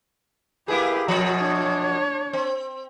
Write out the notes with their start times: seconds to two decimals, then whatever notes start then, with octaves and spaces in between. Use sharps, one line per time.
0.68 A#3 E4 G4 G#4 B4
1.08 F#2 B2 F3 A#5
1.37 D4 C#5
2.33 C4